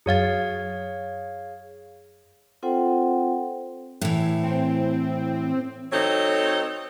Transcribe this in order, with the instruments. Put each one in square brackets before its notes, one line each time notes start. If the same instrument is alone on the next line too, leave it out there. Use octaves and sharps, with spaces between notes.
[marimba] F#2 F#3 A6 [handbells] G#4 C#5 F5
[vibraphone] C4 F4 A4 C5 F#5 G5
[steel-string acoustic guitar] A2 E3
[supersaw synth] C4
[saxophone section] F#3 C4 D#4 A4